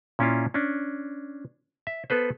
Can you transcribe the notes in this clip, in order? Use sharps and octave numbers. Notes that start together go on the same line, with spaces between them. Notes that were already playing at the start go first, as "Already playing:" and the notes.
A#2 C#4 E4 F4
C#4 D4
E5
B3 A4 B4 C5